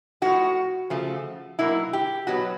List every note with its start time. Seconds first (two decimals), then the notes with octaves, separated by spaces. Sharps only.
0.22 A2 F3 A3 F#4
0.90 C#3 F3 A3
1.59 B2 F#3 A#3 E4
1.93 G4
2.27 B2 F#3 B3 F#4